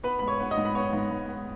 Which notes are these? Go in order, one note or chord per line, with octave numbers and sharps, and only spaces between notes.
B3 B4 B5
G#2 B5
C#5 C#6
B3
D#5 D#6
G#2
B5
B3 C#5 C#6
G#2
G#2
B3